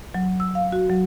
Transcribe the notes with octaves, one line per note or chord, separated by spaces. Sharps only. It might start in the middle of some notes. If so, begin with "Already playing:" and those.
F#3
E6
F5
F#4
F#3